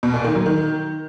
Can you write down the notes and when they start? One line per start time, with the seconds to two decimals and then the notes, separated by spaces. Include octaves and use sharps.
0.03 B2
0.14 A#2
0.24 D#3
0.35 F#3
0.46 D#3